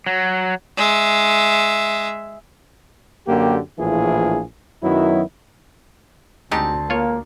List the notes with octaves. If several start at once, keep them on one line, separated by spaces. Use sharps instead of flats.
F#3
G#3 E5
F#2 D3 A#3 G4
A#1 A2 E3 A#3 F4 G#4
F#2 D#3 F#3 B3 E4
D2 G#3 C4 D#4 G4 A5
A#3 F4 C#5